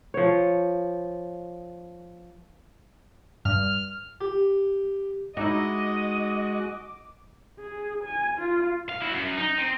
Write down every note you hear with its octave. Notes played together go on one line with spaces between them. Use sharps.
F3 C#5
G2 F6
G4
G#3 D#4 E4 F#4 D#5 D6
G#4
G#5
F4
F5
E4 F#4
F#2
D#4
C4